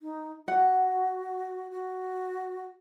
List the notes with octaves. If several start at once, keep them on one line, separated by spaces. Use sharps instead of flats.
D#4
F#4 F#5
F#4